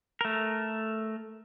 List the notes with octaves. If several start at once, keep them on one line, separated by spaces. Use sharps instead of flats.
A3 A#4